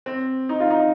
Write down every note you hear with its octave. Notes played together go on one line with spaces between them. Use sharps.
C4
D#4
F4
D#4